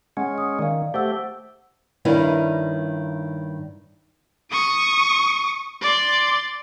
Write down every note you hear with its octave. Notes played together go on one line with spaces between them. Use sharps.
G#3 C#4 F#5
D#6
D#3 D5 F5
A3 G4 C5 F#5 E6
G2 D#3 C#4 E4
C#6 D#6
D5 C6